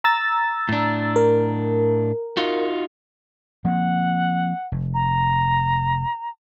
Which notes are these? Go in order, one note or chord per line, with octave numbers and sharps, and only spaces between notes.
A#5 E6 A6
A2 D4
A#4
D#4 F4 F#4
F3 A#3 C4 F#5
F1
A#5